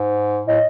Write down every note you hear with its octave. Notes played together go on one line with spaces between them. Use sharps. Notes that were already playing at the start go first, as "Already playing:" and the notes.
Already playing: G#2
A2 D#5